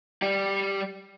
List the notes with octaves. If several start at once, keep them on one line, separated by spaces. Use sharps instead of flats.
G3 G4